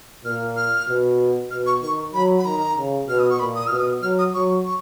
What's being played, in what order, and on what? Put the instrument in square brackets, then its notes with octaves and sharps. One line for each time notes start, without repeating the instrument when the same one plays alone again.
[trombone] A#2 [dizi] F6
[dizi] F6
[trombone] B2
[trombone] B2 [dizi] F6
[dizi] C#6
[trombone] D#3 [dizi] C#6
[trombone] F#3 [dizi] B5
[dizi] B5
[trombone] D#3 [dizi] A#5
[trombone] C#3
[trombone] B2 [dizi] F6
[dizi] D#6
C#6
[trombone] A#2 [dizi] B5
[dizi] D#6
[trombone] B2 [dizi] F6
[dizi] D#6
[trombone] F#3 [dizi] F6
[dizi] D#6
[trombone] F#3 [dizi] C#6
[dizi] C#6